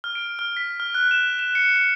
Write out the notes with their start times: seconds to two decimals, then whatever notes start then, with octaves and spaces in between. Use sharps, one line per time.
0.04 F6
0.15 D7
0.39 F6
0.57 B6
0.80 F6
0.95 F#6
1.11 E7
1.39 E7
1.55 C#7
1.76 C#7